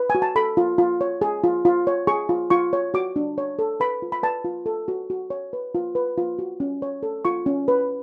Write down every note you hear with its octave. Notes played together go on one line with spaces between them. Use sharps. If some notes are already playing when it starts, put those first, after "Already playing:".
Already playing: B4
G#5
F#4
A5
A4 B5
F4
F4
C#5
G#4
F4
F4
C#5
G#4 C#6
F4
F4 C#6
C#5
F#4 D6
D4
C#5
A4
B4 B5
F4
B5
B4 A5
F4
A4
F#4
F#4
C#5
B4
F4
B4
F4
F#4
C#4
C#5
A4
F4 C#6
C#4
B4